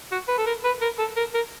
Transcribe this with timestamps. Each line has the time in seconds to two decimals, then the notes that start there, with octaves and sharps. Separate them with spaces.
0.11 F#4
0.28 B4
0.38 A4
0.46 A#4
0.64 B4
0.81 A#4
0.99 A4
1.17 A#4
1.34 A#4